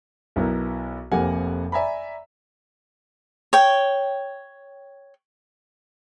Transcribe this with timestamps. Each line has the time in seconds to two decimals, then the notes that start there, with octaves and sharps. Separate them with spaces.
0.36 B1 B3 E4 A#4
1.12 F1 F2 A#3 G4 F#5 G#5
1.72 D5 E5 G#5 A#5 B5
3.53 C#5 G5